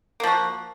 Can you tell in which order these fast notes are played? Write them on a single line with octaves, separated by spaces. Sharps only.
A#3 F3 F#4